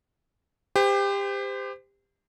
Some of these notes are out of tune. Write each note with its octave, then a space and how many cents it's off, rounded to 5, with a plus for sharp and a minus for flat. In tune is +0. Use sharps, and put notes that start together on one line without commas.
G4 +25 C5 -30